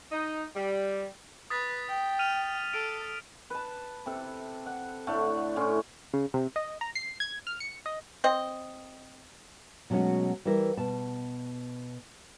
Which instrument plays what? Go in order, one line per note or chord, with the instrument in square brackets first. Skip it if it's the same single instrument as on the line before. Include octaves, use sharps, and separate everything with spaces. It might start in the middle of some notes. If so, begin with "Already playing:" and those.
[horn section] D#4
G3
[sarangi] B4 [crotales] D#6 A6 B6
[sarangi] G5
[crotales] F6 D#7 F7
[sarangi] A4 [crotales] D7
[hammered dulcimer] B4 A5
C3 A4
F#5
A2 D3 A3
A2 C#4 C6
[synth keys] C#3
C3
D#5
A#5
C7
G#6
F6
C#7
D#5
[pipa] C4 D#5
[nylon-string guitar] B2 F#3 G#3 A3 C#4 F#4
E3 G3 E4 A#4
B2 A5